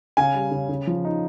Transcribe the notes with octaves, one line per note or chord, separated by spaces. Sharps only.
C#3 F5 G#5
G3
C#3
C#3
F3
D#4